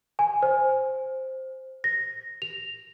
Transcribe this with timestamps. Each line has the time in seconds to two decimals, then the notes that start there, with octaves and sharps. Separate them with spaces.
0.19 G#5
0.43 C5
1.84 A#6
2.42 F7